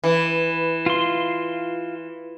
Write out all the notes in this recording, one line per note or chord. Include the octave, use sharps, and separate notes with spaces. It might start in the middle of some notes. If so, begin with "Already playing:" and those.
E3
F4 C6